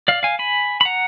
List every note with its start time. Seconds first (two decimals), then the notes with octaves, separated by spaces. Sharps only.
0.08 D5 F5
0.23 F5 G#5
0.39 G#5 B5
0.81 B5
0.85 F#5 A#5